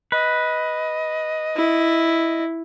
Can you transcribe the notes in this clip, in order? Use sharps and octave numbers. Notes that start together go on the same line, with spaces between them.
B4 D#5
E4